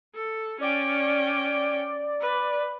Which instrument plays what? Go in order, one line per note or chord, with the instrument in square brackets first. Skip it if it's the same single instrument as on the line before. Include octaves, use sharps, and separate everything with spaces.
[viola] A4
[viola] C#4 G5 [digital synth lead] D5
[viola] B4